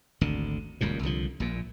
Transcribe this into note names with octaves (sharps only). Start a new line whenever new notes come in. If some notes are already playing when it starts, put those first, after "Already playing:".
G#1 D2 D3
D#1 C#2 F#2 A#2
C2 D3 F3
A#1 A#2